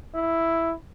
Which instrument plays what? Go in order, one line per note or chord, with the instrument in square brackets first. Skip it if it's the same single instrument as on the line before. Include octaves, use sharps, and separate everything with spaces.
[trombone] E4